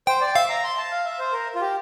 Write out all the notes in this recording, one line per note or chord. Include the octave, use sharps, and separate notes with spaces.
C5 G5
D5
E5 F5
A#5
C6
A5
F5
E5
C5
A#4
F4
G4